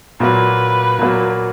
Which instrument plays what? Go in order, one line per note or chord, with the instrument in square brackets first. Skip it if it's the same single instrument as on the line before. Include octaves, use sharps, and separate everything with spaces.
[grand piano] A#2 F#3 A#3 [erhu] B4
[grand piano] A#2 F#3 A#3